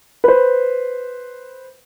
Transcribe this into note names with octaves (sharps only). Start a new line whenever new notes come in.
B4 C5